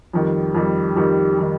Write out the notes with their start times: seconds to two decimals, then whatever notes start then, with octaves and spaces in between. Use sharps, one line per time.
0.13 F2 D#3 G3
0.55 F2 D#3 G3
0.96 F2 D#3 G3
1.39 D#3 G3